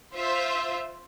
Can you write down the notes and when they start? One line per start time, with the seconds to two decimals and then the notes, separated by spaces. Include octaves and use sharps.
0.14 F4 C5 E5